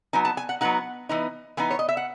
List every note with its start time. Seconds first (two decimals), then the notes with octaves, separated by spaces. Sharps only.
0.13 F#3 B3 D#4 G#5
0.25 A5
0.37 G#5
0.49 F#5
0.61 F#3 B3 D#4 F#5
1.09 E3 B3 D#4
1.57 E3 B3 D#4 G#5
1.71 C#5
1.79 D#5
1.89 E5
1.97 F#5